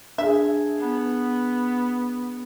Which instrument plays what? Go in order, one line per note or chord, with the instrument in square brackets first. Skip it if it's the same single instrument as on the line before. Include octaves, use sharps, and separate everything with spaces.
[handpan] D4 G#4 [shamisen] E5
[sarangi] B3